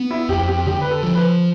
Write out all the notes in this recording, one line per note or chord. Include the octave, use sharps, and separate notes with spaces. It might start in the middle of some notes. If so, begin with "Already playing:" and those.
Already playing: B3
E4
F2 G4
G4
D3 G4
B4
A4
F3
B4